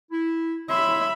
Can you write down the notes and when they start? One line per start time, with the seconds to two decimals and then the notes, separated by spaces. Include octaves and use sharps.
0.11 E4
0.70 C#5 E5 B5 C6